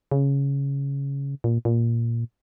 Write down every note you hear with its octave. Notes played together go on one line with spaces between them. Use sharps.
C#3
A#2
A#2